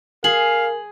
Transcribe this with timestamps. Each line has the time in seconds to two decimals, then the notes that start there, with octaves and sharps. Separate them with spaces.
0.24 G#4 A#4 F5 F#7